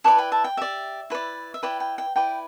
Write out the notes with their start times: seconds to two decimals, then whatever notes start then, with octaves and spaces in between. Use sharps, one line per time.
0.04 E4 B4 D5 A5 D6
0.18 G5 B5
0.32 E5 A5
0.44 G5
0.57 G4 D5 E5
1.10 E4 B4 D5
1.54 E5
1.63 E4 B4 D5 G5
1.80 G5
1.98 G5
2.16 E4 B4 D5 G5